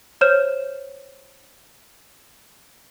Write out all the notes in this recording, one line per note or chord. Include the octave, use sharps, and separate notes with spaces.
C5 C#5 F6 G6 E7